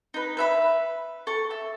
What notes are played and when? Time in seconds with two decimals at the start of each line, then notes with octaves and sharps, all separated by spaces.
0.14 D#4 B4
0.37 B4 E5 B5
1.27 A4 C#6
1.50 E5